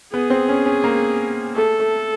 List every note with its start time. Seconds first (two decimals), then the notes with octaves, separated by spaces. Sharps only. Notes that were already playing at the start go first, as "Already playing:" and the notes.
0.13 B3 G#4
0.30 C4
0.49 C#4
0.66 C#4
0.84 A#3
1.56 A3 A4
1.80 A3